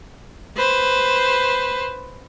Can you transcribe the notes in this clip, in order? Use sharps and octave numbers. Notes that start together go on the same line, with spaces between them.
B4 C5